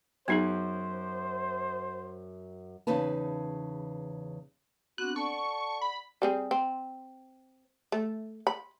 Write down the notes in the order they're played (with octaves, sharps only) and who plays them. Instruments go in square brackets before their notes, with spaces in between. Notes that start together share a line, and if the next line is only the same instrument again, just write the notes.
[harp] F#2 [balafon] B3 D#4 G#4 [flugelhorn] C5
[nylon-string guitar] E2 C#3 D#4 B4 A5
[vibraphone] B3 C4 D4 [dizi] F#4 [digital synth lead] F#6
[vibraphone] A4 D5 F#5 [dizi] A5 [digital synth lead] C#6
[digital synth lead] B5
[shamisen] G3 C4 G#4
C4
A3
B5